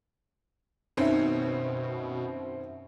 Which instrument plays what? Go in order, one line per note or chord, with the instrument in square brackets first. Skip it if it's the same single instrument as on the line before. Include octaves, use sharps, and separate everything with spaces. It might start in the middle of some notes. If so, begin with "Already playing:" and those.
[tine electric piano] F#2 C5 E5 [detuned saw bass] B2 [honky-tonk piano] D#3 C4 C#4